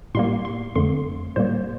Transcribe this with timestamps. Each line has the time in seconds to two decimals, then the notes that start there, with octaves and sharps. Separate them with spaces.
0.15 A2 G3 A#3 C6
0.45 C6
0.75 F2 D3 A3 C6
1.36 A2 G3 A#3 C5